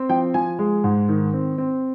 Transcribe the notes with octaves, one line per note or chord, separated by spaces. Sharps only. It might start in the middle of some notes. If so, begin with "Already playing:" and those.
Already playing: C4
F3 G5
F3 G#5
G#3
G#2
D#3
C4
C4